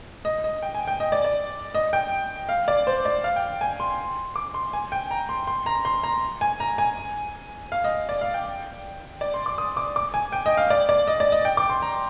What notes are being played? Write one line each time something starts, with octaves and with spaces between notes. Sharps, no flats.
D#5
D#5
G5
G#5
G5
D#5
D5
D5
D#5
G5
F5
D5
C5
D5
F5
G5
G#5
C6
D6
C6
G#5
G5
A#5
C6
C6
A#5
C6
A#5
G#5
A#5
G#5
F5
D#5
D5
F5
G5
D5
C6
D6
D#6
D6
D6
G#5
G5
D#5
F5
D5
D5
D#5
D5
D#5
G5
D6
C6
A#5